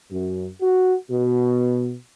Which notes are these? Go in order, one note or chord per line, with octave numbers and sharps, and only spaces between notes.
F#2
F#4
B2